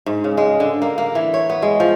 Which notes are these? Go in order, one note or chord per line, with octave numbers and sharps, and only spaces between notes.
G#2
C#3
G#3
D3
A#3
A#3
E3
C#5
B3
G#3
F3